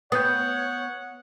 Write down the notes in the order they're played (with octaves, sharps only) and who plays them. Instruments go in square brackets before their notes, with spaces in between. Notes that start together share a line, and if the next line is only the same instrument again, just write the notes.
[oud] B3 [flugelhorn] C#5 [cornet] F#5 [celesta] D#6 G6